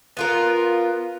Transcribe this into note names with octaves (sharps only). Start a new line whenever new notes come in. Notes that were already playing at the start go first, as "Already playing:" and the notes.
B3 F4 A#4